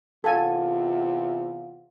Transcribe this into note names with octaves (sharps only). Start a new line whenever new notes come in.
E2 C3 F4 G4 A4 F5 F#5 G#5